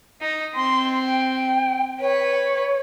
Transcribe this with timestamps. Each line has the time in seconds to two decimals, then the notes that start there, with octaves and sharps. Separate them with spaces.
0.21 D#4
0.55 C4 C6
1.05 G5
2.00 B4 C#5